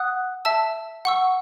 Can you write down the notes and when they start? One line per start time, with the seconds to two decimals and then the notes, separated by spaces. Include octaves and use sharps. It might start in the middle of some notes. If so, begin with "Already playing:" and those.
Already playing: F#5 D#6 F#6
0.45 E5 A5 E6
1.05 F#5 C#6 E6